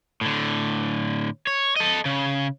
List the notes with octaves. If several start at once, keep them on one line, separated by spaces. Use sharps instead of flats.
A2 D3
C#5
A4 D#5
C#3